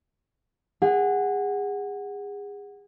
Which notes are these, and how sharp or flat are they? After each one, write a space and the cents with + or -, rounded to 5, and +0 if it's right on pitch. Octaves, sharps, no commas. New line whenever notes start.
G#4 -30 F#5 +0